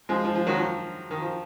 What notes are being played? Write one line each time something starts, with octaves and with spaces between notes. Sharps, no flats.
F3 G#3
F3
F3
D#3 F#3
F3
D#3
F3